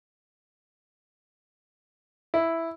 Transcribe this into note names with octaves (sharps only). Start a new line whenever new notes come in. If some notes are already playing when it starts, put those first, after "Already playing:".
E4